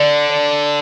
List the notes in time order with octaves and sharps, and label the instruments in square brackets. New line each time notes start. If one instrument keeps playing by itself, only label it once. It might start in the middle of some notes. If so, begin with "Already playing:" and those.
Already playing: [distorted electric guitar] D3 [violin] D5
[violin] D5